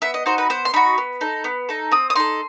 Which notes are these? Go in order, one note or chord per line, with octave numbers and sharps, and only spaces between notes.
B3 E5
D#5
D#4 F#4 C5
B4
B3 C5
C6
D#4 F#4 B5
B3
D#4 A4
B3
D#4 A4
C4 D#6
D#6
D#4 A4 C6